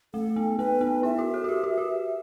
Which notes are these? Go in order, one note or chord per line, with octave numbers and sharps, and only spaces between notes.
A3 A4
B3
B3 B4
B3
E4 E5
F#4
A4
F#4
G4
F#4
G4